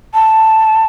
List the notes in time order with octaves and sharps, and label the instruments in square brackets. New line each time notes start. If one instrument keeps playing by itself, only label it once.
[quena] A5